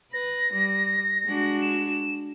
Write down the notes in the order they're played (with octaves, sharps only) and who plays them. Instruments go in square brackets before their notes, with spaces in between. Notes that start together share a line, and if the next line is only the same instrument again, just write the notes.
[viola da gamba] B4 [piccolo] A#6
[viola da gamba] G3
G#3 D4 F#4
[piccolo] E7